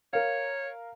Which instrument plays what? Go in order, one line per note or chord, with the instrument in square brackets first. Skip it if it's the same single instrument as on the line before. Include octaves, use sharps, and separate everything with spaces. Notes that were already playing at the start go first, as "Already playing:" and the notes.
[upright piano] A#4 F5 [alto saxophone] C#5